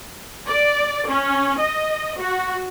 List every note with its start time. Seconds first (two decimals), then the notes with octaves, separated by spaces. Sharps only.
0.49 D5
1.09 C#4
1.61 D#5
2.19 F#4